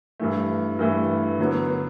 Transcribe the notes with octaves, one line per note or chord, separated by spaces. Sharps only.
G2 E3 A3
G2 E3 A3
D3 F#3 B3